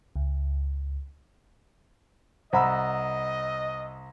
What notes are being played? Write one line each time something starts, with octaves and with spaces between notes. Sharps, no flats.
C#2
C2 C5 D#5 F#5 A#5 B5 E6